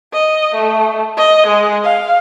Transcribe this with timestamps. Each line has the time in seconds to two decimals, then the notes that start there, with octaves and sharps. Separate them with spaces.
0.13 D#5
0.55 A3
1.17 D#5
1.47 G#3
1.84 F5